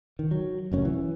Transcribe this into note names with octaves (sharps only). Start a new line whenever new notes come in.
D#3
F#3
F1 F#2 C#4
E3